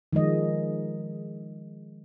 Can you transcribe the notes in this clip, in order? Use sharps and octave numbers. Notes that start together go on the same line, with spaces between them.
D#3 F3 G#3 D#5